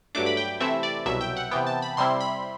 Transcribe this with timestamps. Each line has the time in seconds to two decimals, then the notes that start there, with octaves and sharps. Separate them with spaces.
0.15 G2 F#3 A3 D4 D6
0.26 B5
0.37 G5
0.60 C3 E3 A3 C4 E4 E5
0.83 D5
1.06 C2 B2 F#3 E5
1.21 G5
1.37 F#5
1.51 C3 E3 B3 G5
1.67 A5
1.82 B5
1.97 C3 G3 C4 E4 C6
2.21 B5